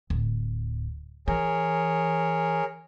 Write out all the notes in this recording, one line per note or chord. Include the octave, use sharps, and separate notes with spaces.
D1
E3 G#4 A#4 C#5